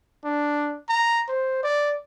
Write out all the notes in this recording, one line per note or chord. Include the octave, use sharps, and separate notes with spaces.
D4
A#5
C5
D5